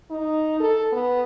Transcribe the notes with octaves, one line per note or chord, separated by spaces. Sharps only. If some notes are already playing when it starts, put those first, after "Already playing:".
D#4
A4
B3